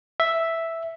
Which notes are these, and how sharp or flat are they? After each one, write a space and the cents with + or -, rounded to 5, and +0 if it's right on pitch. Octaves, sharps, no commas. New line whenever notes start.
E5 +0